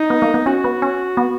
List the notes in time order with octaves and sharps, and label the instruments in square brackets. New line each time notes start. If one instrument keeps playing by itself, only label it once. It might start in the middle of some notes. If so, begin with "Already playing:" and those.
Already playing: [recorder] D#4
[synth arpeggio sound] B3
A#3
B3
[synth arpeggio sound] C#4 [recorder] F#4
[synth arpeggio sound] B3
C#4
B3